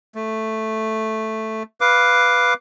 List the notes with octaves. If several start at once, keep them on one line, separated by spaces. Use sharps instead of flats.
A3
B4 F5 D6